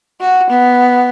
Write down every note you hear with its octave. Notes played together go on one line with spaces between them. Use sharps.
F#4
B3